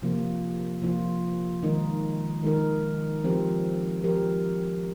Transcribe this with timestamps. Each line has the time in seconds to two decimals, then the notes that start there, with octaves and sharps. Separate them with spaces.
0.02 C3 F3 A#3 F4
0.82 C3 F3 A#3 F4
1.63 D#3 G#3 D#4 A#4
2.43 D#3 G#3 D#4 A#4
3.24 F3 C4 G4 A#4
4.04 F3 C4 G4 A#4